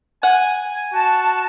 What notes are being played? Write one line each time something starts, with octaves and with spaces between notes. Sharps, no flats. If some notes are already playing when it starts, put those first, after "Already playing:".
F#5 G#5
F#4 A5